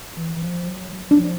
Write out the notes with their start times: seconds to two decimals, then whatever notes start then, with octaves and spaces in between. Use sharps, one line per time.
0.17 E3
0.36 E3
0.42 F3
0.68 F#3
0.92 F#3
1.11 D4
1.17 F3